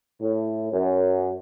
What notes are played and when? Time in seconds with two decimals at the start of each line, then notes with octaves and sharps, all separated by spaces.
0.21 A2
0.72 F#2